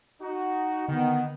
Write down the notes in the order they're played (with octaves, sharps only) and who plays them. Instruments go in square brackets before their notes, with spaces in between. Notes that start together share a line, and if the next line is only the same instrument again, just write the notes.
[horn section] D#4 F#4
[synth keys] D3 [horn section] D#3 [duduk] B3